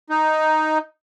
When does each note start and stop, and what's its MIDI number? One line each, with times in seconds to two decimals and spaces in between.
0.10 0.78 63